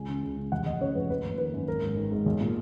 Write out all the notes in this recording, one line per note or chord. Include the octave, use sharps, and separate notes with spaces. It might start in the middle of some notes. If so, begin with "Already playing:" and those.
Already playing: C#2 G#5
C#3
C#2
C#3
F1 F#5
F1 D#5
C#3 C#5
F2 B4
F#1 B4
F#1
D#3 B4
F#2
G#1 A#4
G#1
D#3
G#2
B1
A#2